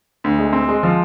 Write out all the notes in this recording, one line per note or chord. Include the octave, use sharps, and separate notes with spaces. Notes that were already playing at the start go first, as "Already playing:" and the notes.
D2
G#3
C4
G#3
F3